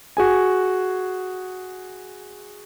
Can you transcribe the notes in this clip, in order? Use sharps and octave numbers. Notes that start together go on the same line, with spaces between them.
F#4 G#4 G#5